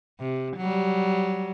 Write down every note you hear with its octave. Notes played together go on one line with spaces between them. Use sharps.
C3
F#3 G3